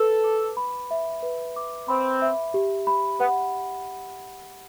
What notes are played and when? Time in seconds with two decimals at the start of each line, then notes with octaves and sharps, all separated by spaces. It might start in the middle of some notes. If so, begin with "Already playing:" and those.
Already playing: A4 B4
0.24 D6
0.57 B5
0.91 E5
1.23 B4
1.56 D6
1.88 C4 B5
2.22 E5
2.54 G4
2.87 B5
3.20 B3 F#5